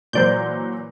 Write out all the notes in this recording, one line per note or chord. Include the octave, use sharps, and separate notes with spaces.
A#2 E3 F#3 C5 D5 G6